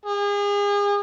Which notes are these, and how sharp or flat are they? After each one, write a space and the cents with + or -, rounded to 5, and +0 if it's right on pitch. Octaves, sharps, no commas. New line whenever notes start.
G#4 -35